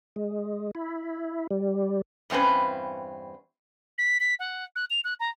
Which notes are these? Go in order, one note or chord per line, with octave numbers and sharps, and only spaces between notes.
G#3
E4
G3
E2 G2 C4 C#4 B4
B6
B6
F#5
F#6
F7
F#6
A#5